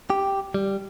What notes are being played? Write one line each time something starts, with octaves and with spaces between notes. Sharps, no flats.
G4
G3